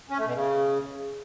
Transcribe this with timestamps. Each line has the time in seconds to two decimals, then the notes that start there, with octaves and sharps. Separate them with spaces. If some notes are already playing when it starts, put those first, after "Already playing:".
0.10 C#4
0.18 A3
0.26 B2
0.35 C#3